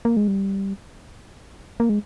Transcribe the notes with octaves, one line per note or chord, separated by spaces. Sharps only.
A#3
G#3
G3
A#3
G#3